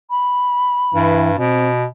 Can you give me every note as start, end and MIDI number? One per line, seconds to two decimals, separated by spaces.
0.10 1.21 83
0.95 1.37 43
0.95 1.30 52
1.38 1.85 47
1.38 1.71 60